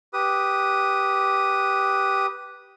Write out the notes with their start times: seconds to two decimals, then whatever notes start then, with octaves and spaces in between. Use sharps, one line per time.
0.13 G4 B4 D#6